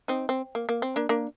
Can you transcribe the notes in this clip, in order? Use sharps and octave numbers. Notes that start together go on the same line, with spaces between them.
C4 D#4
C4
A#3
A#3
C4
A#3 D4
A#3 D4